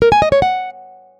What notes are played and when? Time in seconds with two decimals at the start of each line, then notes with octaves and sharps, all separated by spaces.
0.02 A#4
0.12 G#5
0.22 D#5
0.32 C#5
0.42 F#5